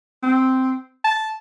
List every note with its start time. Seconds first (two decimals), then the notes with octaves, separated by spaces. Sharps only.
0.23 C4
1.04 A5